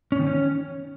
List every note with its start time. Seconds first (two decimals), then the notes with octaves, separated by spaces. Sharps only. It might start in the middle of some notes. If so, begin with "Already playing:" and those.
0.12 C#4
0.19 D#3
0.27 C#4